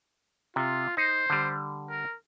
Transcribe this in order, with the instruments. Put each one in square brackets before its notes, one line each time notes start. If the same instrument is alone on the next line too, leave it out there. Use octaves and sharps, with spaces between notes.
[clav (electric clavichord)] C3 [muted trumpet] F4
[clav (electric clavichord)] D#4 [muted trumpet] C5
[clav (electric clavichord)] D3 G3
[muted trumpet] A#4